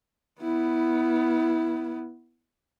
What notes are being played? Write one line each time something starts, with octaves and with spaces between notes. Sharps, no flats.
B3 E4